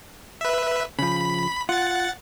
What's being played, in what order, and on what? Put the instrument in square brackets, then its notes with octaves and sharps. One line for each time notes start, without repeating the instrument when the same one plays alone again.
[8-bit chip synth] B4 E5
[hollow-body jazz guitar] C#3 F3 [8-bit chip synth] B5
[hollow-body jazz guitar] F4 [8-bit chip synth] F#5 A6